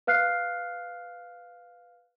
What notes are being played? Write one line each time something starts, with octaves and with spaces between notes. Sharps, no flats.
B4 F5 F6 F#6 C7